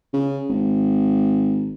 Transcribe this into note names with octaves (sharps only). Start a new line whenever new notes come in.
C#3
G#1